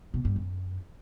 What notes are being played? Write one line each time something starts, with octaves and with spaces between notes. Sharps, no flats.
B2
G2
F#2